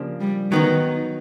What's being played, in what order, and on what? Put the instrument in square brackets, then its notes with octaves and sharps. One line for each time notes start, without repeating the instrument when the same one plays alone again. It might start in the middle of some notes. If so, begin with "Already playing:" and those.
Already playing: [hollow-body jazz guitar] C#3 F3 A#3 D4 G4
[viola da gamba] G3
[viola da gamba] D#3 [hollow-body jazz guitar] F#3 B3 D#4